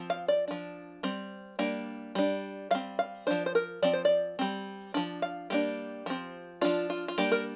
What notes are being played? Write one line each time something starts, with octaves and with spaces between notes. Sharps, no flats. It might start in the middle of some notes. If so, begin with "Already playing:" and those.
Already playing: F3 C4
F5
D5
F3 D4
G3 C4
G3 A#3 D4
G3 D4
G3 C4 F5
F5
F3 D4 C5
C5
A#4
F3 C4 D5
C5
D5
G3 C4
F3 D4
F5
G3 A#3 D4 G4
F3 C4
F3 D4 F4
F4
F4
G3 A#3 D4 G4
A#4